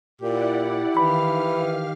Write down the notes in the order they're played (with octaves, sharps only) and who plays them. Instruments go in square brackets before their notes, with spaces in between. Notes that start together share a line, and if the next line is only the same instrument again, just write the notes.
[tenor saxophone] A#2 [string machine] E4 D5 F#5 [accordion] G4
[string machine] D#3 F5 F6 [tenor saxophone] E3 [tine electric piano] B5